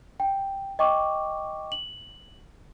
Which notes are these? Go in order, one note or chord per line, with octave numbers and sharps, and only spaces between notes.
G5
D#5 G5 C#6 D6
F#7